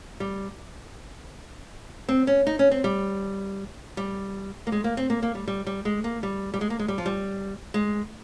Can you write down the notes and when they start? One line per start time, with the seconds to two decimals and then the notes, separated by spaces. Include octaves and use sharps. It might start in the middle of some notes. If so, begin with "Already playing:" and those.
0.20 G3
2.09 C4
2.27 C#4
2.47 D#4
2.59 C#4
2.71 C4
2.84 G3
3.97 G3
4.67 A#3
4.72 G#3
4.84 A#3
4.97 C4
5.10 A#3
5.22 A#3
5.35 G3
5.48 G3
5.67 G3
5.85 G#3
6.04 A#3
6.23 G3
6.54 G3
6.61 G#3
6.70 A#3
6.79 G#3
6.88 G3
6.98 F3
7.06 G3
7.74 G#3